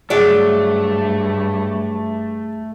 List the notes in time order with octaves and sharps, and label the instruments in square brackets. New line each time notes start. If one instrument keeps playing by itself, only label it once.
[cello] G2 [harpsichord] C#3 [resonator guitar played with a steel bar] F#3 D5 [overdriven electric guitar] A3